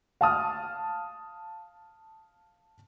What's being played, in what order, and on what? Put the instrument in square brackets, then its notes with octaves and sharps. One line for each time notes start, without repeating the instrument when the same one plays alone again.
[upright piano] F5 A5 D#6 F6